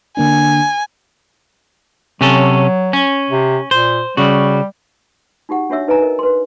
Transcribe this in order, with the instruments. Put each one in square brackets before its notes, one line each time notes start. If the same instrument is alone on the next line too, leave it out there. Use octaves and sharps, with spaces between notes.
[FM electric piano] D3 A#3 D4 [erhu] G#5
[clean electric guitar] C3 C#4 A4 [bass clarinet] F#3
[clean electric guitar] C#4
[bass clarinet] C3
[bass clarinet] A#2 [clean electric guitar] C5
[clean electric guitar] C#3 F#4 [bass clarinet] G3
[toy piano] D#4 F#4 G4 F#5
D4 F#4 C#5 E5 E6
D#4 B4 D#5 G#5 A#5
A#4 D#5
B4 C6